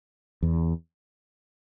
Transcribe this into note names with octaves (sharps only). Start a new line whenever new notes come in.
E2